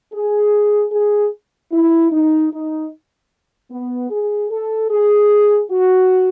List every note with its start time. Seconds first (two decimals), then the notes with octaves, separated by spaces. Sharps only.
0.13 G#4
0.92 G#4
1.72 E4
2.11 D#4
2.52 D#4
3.71 B3
4.10 G#4
4.50 A4
4.90 G#4
5.71 F#4